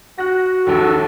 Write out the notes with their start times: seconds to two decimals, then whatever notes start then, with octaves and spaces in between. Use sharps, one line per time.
0.18 F#4 F#6 A#6
0.67 A#1 D#2 A4